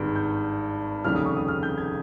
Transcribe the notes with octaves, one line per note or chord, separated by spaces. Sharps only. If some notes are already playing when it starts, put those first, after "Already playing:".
Already playing: G#1 G2 D#3 G#3
G6
F1 D#2 C#3 G3 F6
D#6
C#6
D#6
F6
G6
G#6